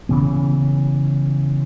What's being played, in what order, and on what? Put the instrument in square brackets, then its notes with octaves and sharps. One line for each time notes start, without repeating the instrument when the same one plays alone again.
[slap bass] C#3 E3 B3